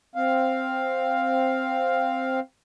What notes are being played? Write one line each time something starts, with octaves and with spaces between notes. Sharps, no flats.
C4 F5